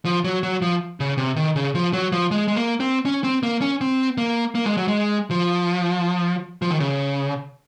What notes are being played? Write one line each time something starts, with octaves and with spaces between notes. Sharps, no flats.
F3
F#3
F#3
F3
C#3
C3
D#3
C#3
F3
F#3
F3
G#3
G#3
A#3
C4
C#4
C4
A#3
C#4
C4
A#3
A#3
G#3
F#3
G#3
F3
F3
D#3
C#3